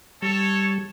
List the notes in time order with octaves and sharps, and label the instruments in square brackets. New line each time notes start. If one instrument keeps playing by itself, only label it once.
[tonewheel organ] G3 [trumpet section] A4 C#5